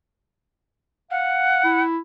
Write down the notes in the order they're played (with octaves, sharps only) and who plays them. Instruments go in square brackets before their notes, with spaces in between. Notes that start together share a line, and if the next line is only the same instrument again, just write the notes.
[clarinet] F5 [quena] F#5
[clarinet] E4